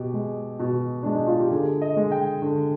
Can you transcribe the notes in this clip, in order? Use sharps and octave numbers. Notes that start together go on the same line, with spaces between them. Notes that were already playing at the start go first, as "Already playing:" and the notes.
Already playing: B2 G4
G#3
B2
G#3 D4
D#4
F4
G4
D3 G#4
D#5
G#3
G5
D3